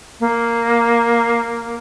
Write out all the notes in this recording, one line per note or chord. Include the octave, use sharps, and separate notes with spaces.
A#3